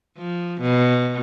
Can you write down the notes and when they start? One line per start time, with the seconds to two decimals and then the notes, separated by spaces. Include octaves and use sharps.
0.17 F3
0.61 B2